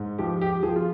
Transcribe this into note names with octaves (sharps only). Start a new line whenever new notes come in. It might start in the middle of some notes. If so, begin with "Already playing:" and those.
Already playing: G#2
F3 G4
G4
F3 G#4
F4